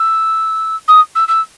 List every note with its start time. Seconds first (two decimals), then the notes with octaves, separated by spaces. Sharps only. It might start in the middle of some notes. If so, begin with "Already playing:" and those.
Already playing: E6
0.88 D#6
1.15 E6
1.28 E6